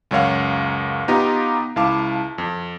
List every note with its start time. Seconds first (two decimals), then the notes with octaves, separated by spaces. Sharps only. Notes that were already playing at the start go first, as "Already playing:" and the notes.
0.11 C#2 F#2 C#5 F5 F#5
1.08 B3 D#4 F4 G4 D#5 A#5
1.76 C#2 E4 F5 A5 D6
2.38 F2